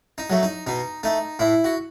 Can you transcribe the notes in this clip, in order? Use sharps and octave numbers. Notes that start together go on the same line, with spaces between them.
D#4
F#3 A3
D#4
B2 D#4
A3 D#4
A2 E4
F#4